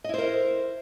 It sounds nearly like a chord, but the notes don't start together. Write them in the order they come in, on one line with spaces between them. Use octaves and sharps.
D#5 E4 C5 A#4